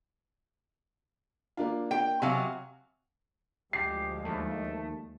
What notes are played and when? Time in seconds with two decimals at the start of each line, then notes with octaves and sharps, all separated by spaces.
1.57 A#3 D4 F4
1.91 G5
2.22 C3 F#3 F5 F#5 G#5
3.73 D2 F3 G#3 G4 C7
4.24 D#2 A3